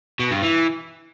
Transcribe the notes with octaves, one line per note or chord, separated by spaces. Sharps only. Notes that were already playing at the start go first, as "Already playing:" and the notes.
B2
G2
E3